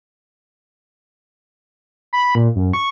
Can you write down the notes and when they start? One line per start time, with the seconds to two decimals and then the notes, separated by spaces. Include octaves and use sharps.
2.13 B5
2.35 A#2
2.56 F#2
2.73 C#6